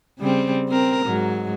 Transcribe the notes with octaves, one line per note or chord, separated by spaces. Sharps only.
C#3 G3 C4
C4 A#4
G#2 F#3